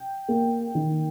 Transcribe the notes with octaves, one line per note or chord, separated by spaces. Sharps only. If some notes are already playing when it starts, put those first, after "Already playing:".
Already playing: G5
A#3
D#3